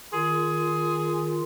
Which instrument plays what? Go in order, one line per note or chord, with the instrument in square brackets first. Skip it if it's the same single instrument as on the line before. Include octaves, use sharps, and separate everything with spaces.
[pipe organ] D#3 F4 [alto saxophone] G#4